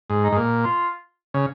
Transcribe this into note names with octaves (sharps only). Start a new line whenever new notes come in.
G#2
D#4
G#2
A#2
F4
C#3